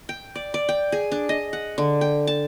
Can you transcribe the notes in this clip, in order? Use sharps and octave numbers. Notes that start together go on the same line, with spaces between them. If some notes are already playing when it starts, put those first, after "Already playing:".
G5
D5
D5
G5
G#4
D4
D#5
F#5
D3
G5
A5